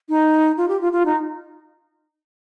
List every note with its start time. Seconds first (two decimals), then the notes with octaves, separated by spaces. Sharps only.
0.09 D#4
0.57 F4
0.68 G4
0.81 F4
0.92 F4
1.06 D#4